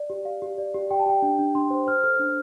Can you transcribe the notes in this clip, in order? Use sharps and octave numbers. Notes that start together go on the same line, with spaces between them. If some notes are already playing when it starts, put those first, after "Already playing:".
Already playing: D5
G4
G4 F5
G4
D5
G4
G4 G5
A5
G4 G5
D4
D4
D4 C6
C5
C5 F6
A4 F6
D4